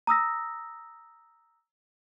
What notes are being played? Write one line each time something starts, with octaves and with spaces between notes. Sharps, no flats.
A#5 D#6 E6 A#6